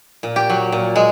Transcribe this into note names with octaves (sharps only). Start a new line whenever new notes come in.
A#2
G4
F#3
A#2
G#3